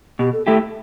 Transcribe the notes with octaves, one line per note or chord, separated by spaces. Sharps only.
B2 G4
A4
A3 E4 G4 A4